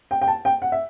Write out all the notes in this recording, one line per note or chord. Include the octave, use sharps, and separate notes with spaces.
G5
G5
A5
G5
F#5
E5